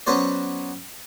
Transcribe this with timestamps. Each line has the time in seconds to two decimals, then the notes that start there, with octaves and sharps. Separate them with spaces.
0.07 F#3 B3 C#4 F#4 C5 D5